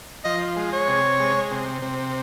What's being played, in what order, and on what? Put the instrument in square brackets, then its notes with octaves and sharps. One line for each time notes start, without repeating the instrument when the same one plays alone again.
[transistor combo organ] F3 [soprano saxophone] D#5
[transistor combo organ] G#3
[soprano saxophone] C#5
[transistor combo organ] C3
G#3
C3
C3